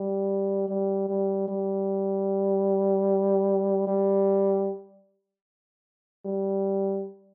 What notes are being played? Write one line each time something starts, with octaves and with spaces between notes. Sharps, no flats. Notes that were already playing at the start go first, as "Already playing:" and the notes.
Already playing: G3
G3
G3
G3
G3
G3